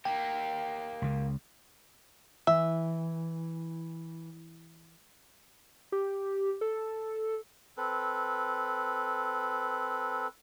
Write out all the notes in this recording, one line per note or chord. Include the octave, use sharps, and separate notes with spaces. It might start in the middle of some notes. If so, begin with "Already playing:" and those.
A#3 G4 G5
C#2 C#3
E3 E5
G4
A4
C4 A4 B4